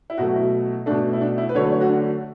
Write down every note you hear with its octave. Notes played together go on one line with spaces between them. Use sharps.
E4
B2 F#3 A3 F#4
E4
B2 A3 D4
E4
D4
E4
B4
D3 F#3 A3 C#5
B4
C#5
F#4
D4